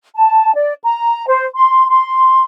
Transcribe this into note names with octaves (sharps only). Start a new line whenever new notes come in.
A5
D5
A#5
C5
C6
C6